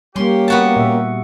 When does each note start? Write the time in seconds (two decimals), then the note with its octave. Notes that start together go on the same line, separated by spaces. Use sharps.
0.16 G3 A#3 C#4 G4 C6
0.48 B3 F#4 A5
0.76 A#2 E5